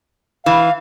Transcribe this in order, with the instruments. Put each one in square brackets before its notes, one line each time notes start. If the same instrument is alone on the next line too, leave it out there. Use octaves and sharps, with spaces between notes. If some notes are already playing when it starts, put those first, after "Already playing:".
[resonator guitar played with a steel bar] E3 [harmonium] F5